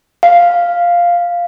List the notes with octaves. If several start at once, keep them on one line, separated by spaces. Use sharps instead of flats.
F5